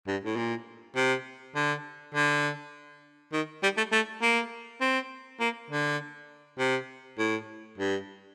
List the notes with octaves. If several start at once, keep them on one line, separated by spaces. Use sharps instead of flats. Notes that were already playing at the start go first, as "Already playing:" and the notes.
G2
A2
A#2
C3
D3
D3
D#3
G3
A3
A3
A#3
C4
A#3
D3
C3
A2
G2